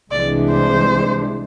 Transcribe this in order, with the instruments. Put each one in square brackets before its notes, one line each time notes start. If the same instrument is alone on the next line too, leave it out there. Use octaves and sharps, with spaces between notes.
[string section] C2 C3 E3 G#3 D4 [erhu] D5
[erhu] C5